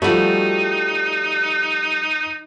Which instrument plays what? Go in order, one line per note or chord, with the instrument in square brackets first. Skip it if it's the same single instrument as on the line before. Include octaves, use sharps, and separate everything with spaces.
[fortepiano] F3 A3 [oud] G3 F#4 [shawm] D#4